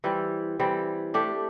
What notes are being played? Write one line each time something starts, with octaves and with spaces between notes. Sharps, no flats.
E3 G3 C4
E3 G3 C4
A3 D4 G4